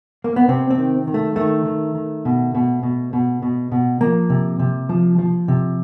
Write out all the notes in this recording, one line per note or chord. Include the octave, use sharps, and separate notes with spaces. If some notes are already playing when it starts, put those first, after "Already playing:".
A#3
B3
C3 C4
C4
D#3
D#3
A3
D#3 A3
D#3
D#3
B2
B2
B2
B2
B2
B2
F3 A#3
C3
C3
F3
F3
C3